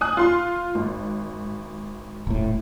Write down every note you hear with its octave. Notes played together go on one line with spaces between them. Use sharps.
G#5 D#6 F#6
F4 C6
G#1
D#1 A2